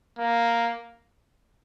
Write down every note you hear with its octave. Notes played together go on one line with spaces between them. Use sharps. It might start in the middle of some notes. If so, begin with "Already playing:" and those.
A#3